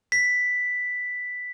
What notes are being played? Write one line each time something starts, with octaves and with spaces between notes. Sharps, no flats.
B6